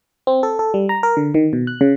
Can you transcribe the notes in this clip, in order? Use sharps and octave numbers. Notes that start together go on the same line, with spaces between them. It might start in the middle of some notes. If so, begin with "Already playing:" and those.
C4
A4
A4
G3
A#5
A#4
D3
D#3
B2
F#6
C#3